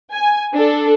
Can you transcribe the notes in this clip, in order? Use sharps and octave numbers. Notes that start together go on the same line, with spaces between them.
G#5
D4 A4